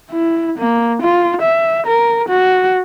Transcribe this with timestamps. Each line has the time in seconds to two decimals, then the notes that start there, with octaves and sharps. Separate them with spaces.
0.11 E4
0.59 A#3
1.02 F4
1.42 E5
1.87 A#4
2.29 F#4